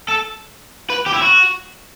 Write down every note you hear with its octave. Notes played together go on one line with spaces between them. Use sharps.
A4
B4
G4
E4
F#4